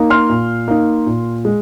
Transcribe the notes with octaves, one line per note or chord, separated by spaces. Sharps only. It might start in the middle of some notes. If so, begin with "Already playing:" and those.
Already playing: A#3 D#4
C6 F6
A#2
A#3 D#4
A#2
G#3